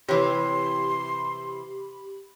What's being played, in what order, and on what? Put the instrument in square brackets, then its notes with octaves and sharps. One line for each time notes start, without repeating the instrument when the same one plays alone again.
[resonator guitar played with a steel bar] C3 E3 [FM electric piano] G4 B5 [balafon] C#5 [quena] C6